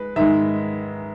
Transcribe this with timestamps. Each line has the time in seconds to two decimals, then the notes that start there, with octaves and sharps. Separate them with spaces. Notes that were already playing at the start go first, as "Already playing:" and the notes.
Already playing: G#3 B4
0.16 G#2 D#3 G#3 E5